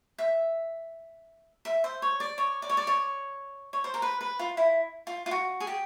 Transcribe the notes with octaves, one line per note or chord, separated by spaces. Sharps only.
E5
E5
C5
C#5
D5
C#5
D5
C#5
D5
C#5
C#5
C5
A#4
B4
B4
F4
E4
F4
F4
F#4
G#4
G4